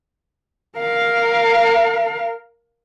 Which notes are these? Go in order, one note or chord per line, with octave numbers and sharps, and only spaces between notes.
A#4 F5